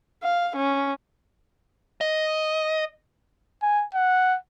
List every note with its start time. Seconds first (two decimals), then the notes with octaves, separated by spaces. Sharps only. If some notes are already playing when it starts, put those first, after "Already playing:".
0.22 F5
0.56 C#4
2.01 D#5
3.63 G#5
3.95 F#5